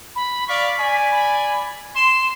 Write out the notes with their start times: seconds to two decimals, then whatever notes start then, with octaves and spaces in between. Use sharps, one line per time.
0.15 B5
0.47 D5 F5 C#6 B6
0.79 D5 G#5
1.11 B5
1.96 C6 E7